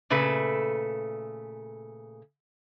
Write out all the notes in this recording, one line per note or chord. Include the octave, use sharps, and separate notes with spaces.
A#2 C#3 A3 B4